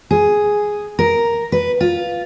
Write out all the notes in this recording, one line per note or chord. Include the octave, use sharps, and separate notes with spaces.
G#4
A#4
B4
F4